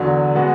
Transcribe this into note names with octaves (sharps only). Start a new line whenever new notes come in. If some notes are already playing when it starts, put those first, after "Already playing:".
Already playing: E2 D3 F#3
B2 G#3 B3 F#4